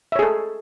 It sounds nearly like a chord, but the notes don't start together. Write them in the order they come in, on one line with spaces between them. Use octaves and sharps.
E5 C#5 G#4 A4